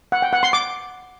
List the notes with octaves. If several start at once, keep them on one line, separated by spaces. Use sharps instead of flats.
F#5
G5
F#5
C6
D6